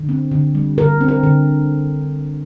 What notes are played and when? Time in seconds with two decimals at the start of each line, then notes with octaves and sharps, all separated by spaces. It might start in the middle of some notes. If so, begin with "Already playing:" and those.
Already playing: D3
0.09 C4
0.32 D3
0.55 G3
0.78 D3 A#4
1.01 C4
1.08 A#4
1.23 D3